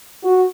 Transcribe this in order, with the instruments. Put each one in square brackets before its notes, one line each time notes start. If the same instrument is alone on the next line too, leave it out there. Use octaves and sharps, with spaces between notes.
[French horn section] F#4